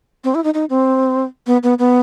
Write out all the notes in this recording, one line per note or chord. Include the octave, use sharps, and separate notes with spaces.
C4
E4
D#4
D#4
C4
B3
B3
B3